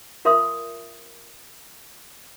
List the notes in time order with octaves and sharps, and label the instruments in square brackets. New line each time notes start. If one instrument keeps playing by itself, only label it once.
[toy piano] F4 A#4 E5 F5 C6 D#6